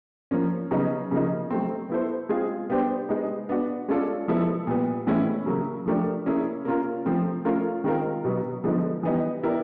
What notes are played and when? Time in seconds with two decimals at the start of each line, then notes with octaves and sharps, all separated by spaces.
0.31 F3 A#3 C#4
0.71 C#3 F#3 B3 D#4
1.11 C#3 F3 A#3 D#4
1.50 F#3 A3 C4
1.90 B3 E4 A4 C5
2.29 G#3 C4 F4 G#4
2.70 G3 B3 D4 G4 C5
3.09 G#3 B3 D#4
3.49 B3 D4 F#4
3.88 G#3 C#4 F4 A4 D5
4.28 F3 G#3 B3 E4 A4
4.67 A#2 G3 B3
5.07 A2 E3 G#3 C#4 E4
5.46 C#3 F#3 A#3
5.86 F3 A3 D4 G4 A#4
6.26 A#3 C#4 E4 G#4
6.65 A#3 C#4 F4 A#4
7.06 F3 A3 C4
7.45 A3 C#4 F4 A#4
7.84 D#3 G#3 C4 F4 A#4
8.24 B2 F#3 B3
8.64 D3 F3 G#3 B3 D#4
9.03 E3 G3 B3 D#4
9.43 B3 E4 G4 A#4 D5